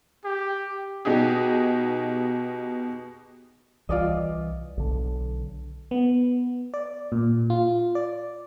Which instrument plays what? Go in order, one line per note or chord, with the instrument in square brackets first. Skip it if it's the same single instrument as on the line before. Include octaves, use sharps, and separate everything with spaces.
[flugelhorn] G4
[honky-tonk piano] B2 D#4 G4 G#4
[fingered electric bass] C2 E3 [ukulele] F4 D5 D#5
[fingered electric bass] B1 D3
[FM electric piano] B3
D5
A#2
F4
D5